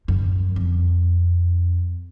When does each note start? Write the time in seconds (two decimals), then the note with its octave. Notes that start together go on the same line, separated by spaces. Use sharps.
0.08 F#2
0.56 F2